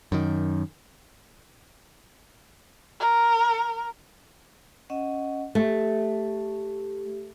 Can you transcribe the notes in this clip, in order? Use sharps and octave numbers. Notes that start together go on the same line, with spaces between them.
F#2 D#3
A#4
C#4 D#5 F#5
A3 G4